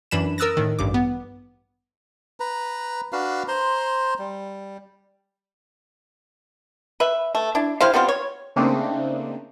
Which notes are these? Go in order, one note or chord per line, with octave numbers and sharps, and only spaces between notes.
F#2 E3 D4 B5 E7
A#4 D#6 E6 F#6 A6 A#6
A2 D#3
A1 G2 D6
B3
B4 A#5
D4 F#4 B4 F5
C5 A#5 C6
G3
B4 E5
A3
D4 E4
E4 G4 C5 F5
G3 B3 C4 F4
C#5
C#3 A3 A#3 C4 D4 D#4